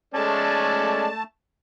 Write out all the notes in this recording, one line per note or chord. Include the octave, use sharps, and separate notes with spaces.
G#3 A3 C#4 D5 A5